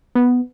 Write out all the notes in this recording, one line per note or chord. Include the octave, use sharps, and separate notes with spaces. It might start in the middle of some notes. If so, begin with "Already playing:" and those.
B3